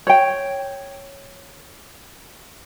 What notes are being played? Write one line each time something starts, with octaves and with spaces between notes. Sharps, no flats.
C#5 G5